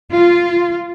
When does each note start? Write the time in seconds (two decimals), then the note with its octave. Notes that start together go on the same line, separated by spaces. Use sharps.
0.13 F4